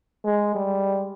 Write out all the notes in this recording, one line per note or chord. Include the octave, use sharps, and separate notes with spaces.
G#3
G3